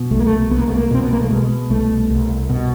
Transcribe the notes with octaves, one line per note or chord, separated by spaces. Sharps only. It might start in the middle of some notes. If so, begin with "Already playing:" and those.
Already playing: B2
C2 A3
A#3
A3
C2 B3
A#3
A3
A#3
B2 C4
B3
A#3
A3
B2 G#3
C2 A3
C2
B2